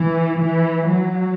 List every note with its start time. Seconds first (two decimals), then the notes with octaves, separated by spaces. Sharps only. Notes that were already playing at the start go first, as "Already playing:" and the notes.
Already playing: E3
0.39 E3
0.88 F#3